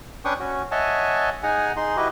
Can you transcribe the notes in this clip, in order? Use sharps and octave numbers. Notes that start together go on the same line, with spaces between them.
C#4 D4 B4 G5 C#6 D#6
C#4 F#4
C#5 D#5 E5 F#5 G#5 A5
D#4 G#4 F#5 G#5 A#5
D#4 G#4 C6
E4 F#4 G4 B4 D#5